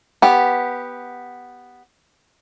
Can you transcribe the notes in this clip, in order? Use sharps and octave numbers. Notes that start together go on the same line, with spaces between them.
B3 G4